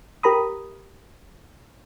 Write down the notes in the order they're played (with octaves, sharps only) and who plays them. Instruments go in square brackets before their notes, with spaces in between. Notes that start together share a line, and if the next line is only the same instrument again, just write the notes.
[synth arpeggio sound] G4 A#4 A#5 B5 D#6